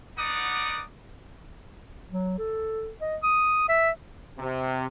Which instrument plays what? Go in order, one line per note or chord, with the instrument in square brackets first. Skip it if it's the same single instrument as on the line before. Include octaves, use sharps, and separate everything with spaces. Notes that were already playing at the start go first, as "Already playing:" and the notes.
[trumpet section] B3 D#4 D5 F#5 D6 D#6
[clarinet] F#3
A4
D#5
D#6
E5
[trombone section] C3